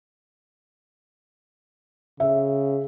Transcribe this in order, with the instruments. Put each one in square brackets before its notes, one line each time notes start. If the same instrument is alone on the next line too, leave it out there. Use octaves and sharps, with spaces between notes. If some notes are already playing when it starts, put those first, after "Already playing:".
[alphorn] C#3 [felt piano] E5